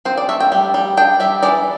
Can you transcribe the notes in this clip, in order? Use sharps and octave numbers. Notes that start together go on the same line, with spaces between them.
C4 C5
D5
A3 E5
G5
G3
G3
D4 G5
G3 E5
E3 D5